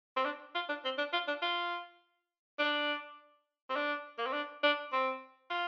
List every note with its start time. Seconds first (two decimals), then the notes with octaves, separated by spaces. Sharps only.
0.17 C4
0.25 D4
0.55 F4
0.69 D4
0.85 C4
0.98 D4
1.13 F4
1.28 D4
1.42 F4
2.59 D4
3.69 C4
3.76 D4
4.18 A#3
4.26 C4
4.33 D4
4.63 D4
4.93 C4
5.50 F4